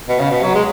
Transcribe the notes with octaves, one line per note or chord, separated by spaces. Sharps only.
B2
C#3
B2
F#3
G#3